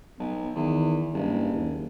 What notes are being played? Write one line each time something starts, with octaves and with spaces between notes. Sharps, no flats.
B1 B3
E2 D#3
F#1 G2
D#2